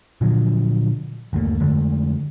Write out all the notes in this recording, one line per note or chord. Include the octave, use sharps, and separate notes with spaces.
A#2 D3 F3 F#3
G1 D#2 A3 A#3
F2 D3 G#3 A3